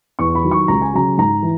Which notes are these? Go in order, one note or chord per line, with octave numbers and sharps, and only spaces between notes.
E2 C#6
B5
D#3 F#3
C#6
C#2 A#5
G#5
C#3 F#3 A#5
G#2 A#5
E3